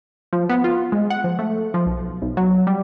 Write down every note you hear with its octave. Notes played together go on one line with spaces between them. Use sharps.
F3
B3
F4
G#3
F#5
F3
A3
F3
B1
B1
F#3
G3